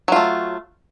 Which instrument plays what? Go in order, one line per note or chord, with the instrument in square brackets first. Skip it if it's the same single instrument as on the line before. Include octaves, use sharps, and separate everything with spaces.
[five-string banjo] F#3
F4
A3